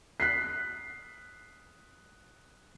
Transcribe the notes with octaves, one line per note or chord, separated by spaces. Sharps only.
F#6 B6 C7